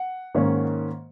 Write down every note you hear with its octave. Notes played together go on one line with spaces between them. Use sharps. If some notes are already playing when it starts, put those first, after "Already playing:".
Already playing: F#5
G#2 D#3 A#3 C#4